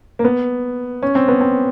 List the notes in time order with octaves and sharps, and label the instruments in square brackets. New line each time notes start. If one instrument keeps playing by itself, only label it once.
[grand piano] A#3
B3
C#4
C4
B3
C4